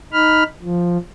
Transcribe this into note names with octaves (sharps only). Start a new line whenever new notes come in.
D#4 B5 F6
F3